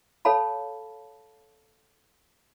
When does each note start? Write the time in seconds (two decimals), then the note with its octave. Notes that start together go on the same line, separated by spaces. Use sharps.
0.25 A4 C#5 F5 A5 B5